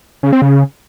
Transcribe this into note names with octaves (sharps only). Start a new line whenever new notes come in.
C#3
C4
C#3